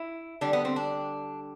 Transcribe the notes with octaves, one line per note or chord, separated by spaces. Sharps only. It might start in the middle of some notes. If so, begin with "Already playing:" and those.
Already playing: E4
D3 G3 D4
B3
C4
D4